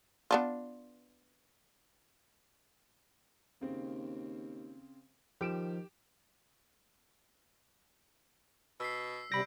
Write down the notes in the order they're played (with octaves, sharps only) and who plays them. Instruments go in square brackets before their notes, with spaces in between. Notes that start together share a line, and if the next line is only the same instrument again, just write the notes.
[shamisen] B3 D4 F4
[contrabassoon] D#2 [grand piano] C#3 C4
[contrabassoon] D#3 [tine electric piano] F3 [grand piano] G4 D7 E7
[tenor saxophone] B2 [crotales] E6 B6 C7
[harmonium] C3 G3 [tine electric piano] B5 A#6 [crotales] G6 D7